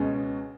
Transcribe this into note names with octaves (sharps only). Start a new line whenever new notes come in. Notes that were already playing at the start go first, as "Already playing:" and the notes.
Already playing: C#2 B2 G#3 C#4